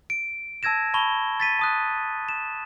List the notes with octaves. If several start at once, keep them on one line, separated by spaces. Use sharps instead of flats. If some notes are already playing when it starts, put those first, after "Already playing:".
D7
A5 E6 G#6 A#6 E7
A5 B5 C#6 G7
A6 B6 D#7
A5 D#6 F#6
E7